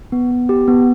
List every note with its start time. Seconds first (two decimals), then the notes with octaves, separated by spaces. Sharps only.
0.12 B3
0.31 B3
0.49 G4
0.68 B3